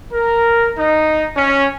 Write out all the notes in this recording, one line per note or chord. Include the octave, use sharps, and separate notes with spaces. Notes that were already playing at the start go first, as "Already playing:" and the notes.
A#4
D#4
C#4